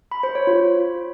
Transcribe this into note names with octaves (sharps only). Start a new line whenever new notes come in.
B5
C5
C#5
F4